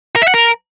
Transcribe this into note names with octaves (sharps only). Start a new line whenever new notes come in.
A#4
E5
F#5
A#4